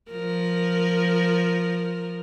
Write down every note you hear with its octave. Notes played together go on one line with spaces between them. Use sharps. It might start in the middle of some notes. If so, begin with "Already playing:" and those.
F3 A#4